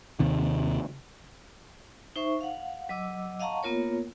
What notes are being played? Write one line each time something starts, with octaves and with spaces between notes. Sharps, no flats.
D#2 C3 D#3
D#4 C5 E5 C#6
F5 F#5
F#3 D#5 D6 E6
D#5 F5 F#5 A5 A#5 C#6
A#3 B3 F4 A#4 C#5